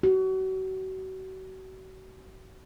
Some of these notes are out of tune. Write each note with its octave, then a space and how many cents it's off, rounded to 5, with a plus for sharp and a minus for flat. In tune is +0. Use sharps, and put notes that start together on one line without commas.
F#4 +35